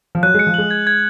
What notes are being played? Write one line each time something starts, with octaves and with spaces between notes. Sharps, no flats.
F3
F#3 F#6
G#3 C#7
F3
G#3 F#7
G#6
G#6